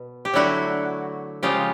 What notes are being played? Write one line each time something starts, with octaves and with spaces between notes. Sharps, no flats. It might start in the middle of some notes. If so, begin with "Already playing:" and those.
Already playing: B2
G4
D3 F#3 A3 E4 F#4
C#3 F3 G#3 F4 G4